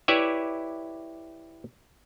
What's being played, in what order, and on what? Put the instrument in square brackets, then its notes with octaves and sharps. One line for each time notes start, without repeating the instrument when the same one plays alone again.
[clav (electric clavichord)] E4 G4 B4 C#5 D5 E5